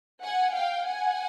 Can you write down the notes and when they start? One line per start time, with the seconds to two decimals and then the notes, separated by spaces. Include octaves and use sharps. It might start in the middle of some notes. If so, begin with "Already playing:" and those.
0.23 F#5 G#5
0.55 F5 G5
0.86 F#5 G#5